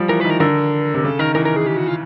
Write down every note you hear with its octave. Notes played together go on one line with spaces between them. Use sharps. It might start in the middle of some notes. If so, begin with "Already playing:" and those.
Already playing: F3 G3
E3 A#4
D#3 B4
A#4
D3 A#4
C3
C#3 A4
D#3 A#4
E3 A#4
A#4
G#4
G4
F#4
F4